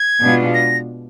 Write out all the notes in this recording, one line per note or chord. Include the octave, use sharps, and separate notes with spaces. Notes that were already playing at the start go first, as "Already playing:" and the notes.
Already playing: G#6
B2 G#3 B3 D4 F4
A#6